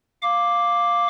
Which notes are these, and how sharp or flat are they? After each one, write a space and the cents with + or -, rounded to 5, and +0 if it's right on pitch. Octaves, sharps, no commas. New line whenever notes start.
F5 +0 D6 +0